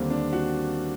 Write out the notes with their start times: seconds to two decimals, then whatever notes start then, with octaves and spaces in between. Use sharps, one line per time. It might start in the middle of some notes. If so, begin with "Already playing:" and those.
Already playing: D#2 D3 G3 A#3 C4
0.10 D4
0.33 F#4